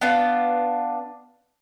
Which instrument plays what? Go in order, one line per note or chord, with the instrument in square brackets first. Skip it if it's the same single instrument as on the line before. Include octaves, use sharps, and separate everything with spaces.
[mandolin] B3 D4 F4